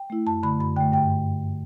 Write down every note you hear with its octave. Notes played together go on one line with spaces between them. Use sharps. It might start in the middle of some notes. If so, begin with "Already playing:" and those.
Already playing: G5
A3 E4
F#2 A5
D3 A3 B5
F#2 B5
D3 A3 G5
G2 G5